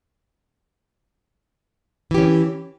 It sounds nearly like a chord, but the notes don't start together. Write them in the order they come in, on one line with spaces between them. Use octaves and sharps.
E3 G4 C#4